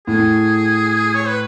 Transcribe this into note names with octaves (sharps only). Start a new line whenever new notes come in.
A2 G#4
C#5
B4